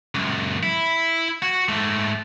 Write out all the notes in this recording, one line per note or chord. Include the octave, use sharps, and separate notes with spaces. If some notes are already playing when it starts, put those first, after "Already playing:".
C#2 F#2
E4
F#4
G#2 A3